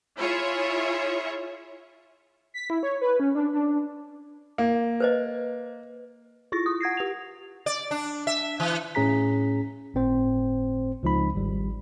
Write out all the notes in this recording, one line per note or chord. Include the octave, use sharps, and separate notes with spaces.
E4 F4 G#4 C#5 E5
B6
E4
C#5
B4
C#4
D4
D4
A#3
B4 C5 D#5
E4 F4 C#6 A6 A#6
D#6
F#5 G#6 A#6 C7
G4 F7
D5
D4
E5
E3
A2 C#4 G#4 A#5 B6
G1 A2 C4 C5
C#2 F3 D#4 B5
G#1 G3